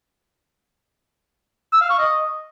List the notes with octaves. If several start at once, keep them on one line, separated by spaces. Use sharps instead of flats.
E6
F5
C#6
D#5